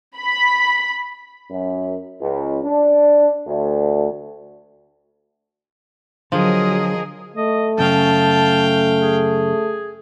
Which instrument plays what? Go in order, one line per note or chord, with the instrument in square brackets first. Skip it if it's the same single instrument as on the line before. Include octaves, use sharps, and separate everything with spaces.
[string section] B5
[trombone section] F#2
C#2
D4
D2
[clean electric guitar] D3 [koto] F3 [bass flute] F#3 [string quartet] G#4 A#4 D#5
[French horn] A3 [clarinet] D#5
[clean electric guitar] F#2 C#3 C#4 [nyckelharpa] F5 G5 [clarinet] A5
[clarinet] G#4